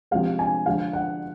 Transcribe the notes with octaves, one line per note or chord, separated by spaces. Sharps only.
C3 F3 G#3 F5
G#5
D3 F3 G#3 F5
F#5